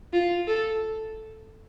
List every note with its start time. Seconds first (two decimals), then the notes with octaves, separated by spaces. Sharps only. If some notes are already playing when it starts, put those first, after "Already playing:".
0.13 F4
0.48 A4